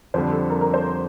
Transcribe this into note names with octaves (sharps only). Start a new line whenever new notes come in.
F2 D3 G3 C5
A4
A#4
A#4
C5